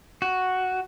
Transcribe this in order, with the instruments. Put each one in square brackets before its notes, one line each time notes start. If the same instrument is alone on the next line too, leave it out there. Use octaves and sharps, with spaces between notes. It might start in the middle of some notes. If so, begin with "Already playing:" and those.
[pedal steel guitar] F#4